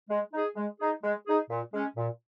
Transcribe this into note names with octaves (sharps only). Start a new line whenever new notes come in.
G#3
D#4 G#4
G#3
D#4 G#4
G#3
D#4 G#4
A#2
G#3 C#4
A#2